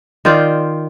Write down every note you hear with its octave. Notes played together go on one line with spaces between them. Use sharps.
D#3 F4 C5 D5